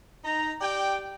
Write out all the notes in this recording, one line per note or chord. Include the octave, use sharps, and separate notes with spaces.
D#4 A#5
G4 D5 G5